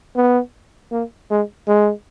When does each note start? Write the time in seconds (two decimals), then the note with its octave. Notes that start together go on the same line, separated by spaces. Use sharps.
0.16 B3
0.91 A#3
1.30 G#3
1.67 G#3